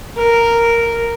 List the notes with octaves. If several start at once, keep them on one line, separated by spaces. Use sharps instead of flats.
A#4